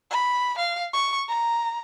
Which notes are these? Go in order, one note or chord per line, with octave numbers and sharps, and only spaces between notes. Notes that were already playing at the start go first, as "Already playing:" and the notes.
B5
F5
C#6
A#5